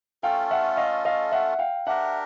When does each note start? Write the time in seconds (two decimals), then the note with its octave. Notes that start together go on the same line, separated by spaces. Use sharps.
0.23 A3 C#4 F4 A4 F5 G5
0.51 E5 F#5
0.77 D#5 F5
1.05 D#5 F5
1.32 E5 F#5
1.59 F5 G5
1.86 D4 G4 A#4 E5 F#5